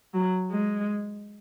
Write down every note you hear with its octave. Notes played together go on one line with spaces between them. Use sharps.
F#3
G#3